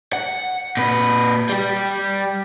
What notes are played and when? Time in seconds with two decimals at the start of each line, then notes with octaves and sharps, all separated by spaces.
0.13 F#5
0.77 A#2 B4
1.49 G3 G4